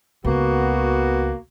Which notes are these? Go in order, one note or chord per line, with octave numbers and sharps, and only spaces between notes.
C#2 A#3 B3 F#4